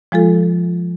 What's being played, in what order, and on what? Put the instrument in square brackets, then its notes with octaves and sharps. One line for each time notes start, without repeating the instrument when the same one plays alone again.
[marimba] F3 G#3 F4 A4